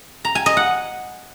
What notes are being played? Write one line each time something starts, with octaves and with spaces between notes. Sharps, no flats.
A#5
G#5
D#5
F#5